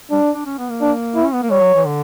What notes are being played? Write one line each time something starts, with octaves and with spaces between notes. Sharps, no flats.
G3 D4
D4
C#4
B3
A#3
D4
E4
C#4
B3
A#3
G3 C#5
F#3
E3
D3